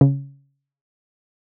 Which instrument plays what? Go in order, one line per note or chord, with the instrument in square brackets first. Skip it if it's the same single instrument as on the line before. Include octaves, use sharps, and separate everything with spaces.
[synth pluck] C#3